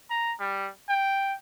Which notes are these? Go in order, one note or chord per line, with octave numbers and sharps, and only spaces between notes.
A#5
G3
G5